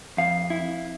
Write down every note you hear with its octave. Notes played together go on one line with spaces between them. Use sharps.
F2 F5
E4